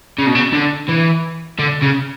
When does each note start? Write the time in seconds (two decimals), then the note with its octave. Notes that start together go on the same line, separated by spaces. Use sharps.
0.18 C#3
0.27 B2
0.35 C#3
0.53 D3
0.89 E3
1.59 D3
1.82 C#3